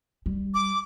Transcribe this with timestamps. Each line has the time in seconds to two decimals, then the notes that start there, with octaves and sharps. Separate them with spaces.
0.26 G3
0.54 D6